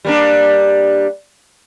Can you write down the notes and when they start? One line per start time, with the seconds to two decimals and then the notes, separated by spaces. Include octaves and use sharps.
0.05 G3 A#3 D4